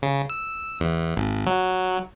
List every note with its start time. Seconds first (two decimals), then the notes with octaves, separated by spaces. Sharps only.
0.02 C#3
0.30 E6
0.80 E2
1.17 G#1
1.47 F#3